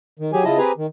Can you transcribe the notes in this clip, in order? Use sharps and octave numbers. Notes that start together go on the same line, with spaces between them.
D#3
F#3 G4 G#4 G#5
C#3 E4 F4 D#5 A5
C4 G4 G#4 B4 G#5 A#5
D#3